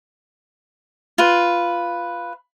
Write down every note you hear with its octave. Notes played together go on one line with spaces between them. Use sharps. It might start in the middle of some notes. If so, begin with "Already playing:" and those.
F4 B4